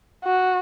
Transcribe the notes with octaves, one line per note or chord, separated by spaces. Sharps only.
F#4